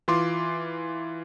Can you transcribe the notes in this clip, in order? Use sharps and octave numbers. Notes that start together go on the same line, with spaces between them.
E3 F4 C6 D6